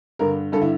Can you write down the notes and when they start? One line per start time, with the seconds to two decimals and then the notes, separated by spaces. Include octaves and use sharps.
0.19 G2 D3 A#4
0.52 G2 D3 A4
0.62 E4